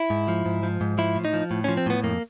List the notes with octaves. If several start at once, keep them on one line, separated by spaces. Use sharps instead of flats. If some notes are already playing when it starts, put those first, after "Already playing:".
Already playing: E4
G#2
F3
G#2
F3
G#2
F3 E4
A2
D#4
F3
A2
C#4
F3
C4
A2 B3
F2 A#3